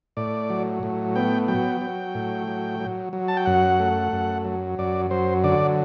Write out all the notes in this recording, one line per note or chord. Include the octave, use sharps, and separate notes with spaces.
A2 D5
F#3
A2
B3 G5
F#3 G5
F#3
A2
F#3
F#3
F#3
A5
G5
F#2 F#5
A3
F#2
F#3
F#2 D5
F#3 C5
D3 D5